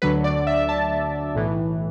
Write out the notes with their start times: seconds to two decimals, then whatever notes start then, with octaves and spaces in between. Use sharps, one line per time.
0.02 D2 D3 F#3 B4
0.24 D5
0.47 E5
0.69 A5
1.35 B1 A2 E3